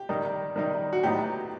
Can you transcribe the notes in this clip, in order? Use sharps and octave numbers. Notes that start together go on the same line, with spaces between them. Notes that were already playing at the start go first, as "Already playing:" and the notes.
Already playing: G4
D#3 G3 D#4
D#3 G3 D#4
F#4
A2 F#3 B3 D#4 G4